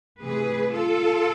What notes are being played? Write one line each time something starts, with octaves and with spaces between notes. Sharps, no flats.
C3 E3 A3 G#4 B4
F4 A4